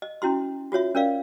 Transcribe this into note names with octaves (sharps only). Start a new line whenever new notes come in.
D#5
C#4 E4 F#4 C6
F4 F#4 C#5 E5
C#4 A#4 D5 F5